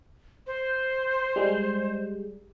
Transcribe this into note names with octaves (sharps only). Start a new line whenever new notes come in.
C5
G3 G#3